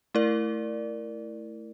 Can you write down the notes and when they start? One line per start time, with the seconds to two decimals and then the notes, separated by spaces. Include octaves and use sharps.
0.14 A3 E4 A#4 D5